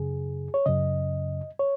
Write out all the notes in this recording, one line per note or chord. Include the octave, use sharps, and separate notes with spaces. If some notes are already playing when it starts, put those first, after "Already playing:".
Already playing: F#2 C#3 G#4
C#5
F#2 C#3 D#5
C#5